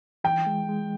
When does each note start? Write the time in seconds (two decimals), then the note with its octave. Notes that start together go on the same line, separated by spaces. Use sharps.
0.24 E3 G5
0.47 G#3
0.69 G#3